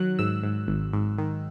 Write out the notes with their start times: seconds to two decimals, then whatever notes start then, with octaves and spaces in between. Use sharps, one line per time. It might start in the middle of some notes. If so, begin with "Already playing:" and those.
Already playing: D#3 F#3 F#6
0.19 G#2 E6
0.43 G#2
0.68 G#1
0.93 G#2
1.18 D#3